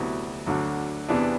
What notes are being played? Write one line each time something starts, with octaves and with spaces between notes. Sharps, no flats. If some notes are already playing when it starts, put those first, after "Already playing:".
Already playing: D2 C3 F#3 B3 E4
D2 D3 F#3
E2 C3 E3 B3 D4